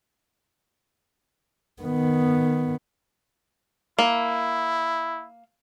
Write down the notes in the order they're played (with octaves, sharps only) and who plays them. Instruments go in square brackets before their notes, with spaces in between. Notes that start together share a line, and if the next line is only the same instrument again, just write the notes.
[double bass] D#3 B3
[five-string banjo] A#3 [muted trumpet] E4